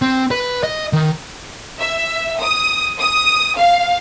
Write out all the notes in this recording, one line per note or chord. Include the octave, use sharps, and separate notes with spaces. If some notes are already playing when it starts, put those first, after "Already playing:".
C4
B4
D#5
D#3
E5
D#6
D#6
F5